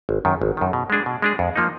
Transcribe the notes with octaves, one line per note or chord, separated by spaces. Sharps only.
G#1
F#2 D#3
G#1
F#2 D#3
B2
G#3 D4 G#4
B2
G#3 D4 G#4
F2
F3 A#3 D#4